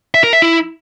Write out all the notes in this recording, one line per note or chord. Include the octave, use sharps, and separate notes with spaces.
E5
A#4
E5
E4